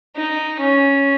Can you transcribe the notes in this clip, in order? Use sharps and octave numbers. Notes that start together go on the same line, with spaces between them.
D#4
C#4